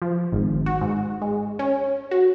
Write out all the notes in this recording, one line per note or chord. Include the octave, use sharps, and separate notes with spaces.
F3
G#1
F#4
G#2
G#3
C#4
F#4